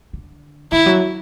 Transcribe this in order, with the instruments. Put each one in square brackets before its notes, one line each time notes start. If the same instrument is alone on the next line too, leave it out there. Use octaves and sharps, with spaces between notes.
[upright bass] D3
[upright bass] D#3 [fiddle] E4
[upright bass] F#3